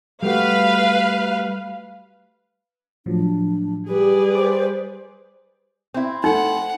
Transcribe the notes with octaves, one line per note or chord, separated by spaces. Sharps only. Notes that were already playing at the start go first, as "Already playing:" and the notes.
G3 A3 F#4 B4 F5
A2 F3 F#3 D4
G3 G4 G#4 B4 D5
C5 D6
C4 E4
A3 D#4 A4 F#5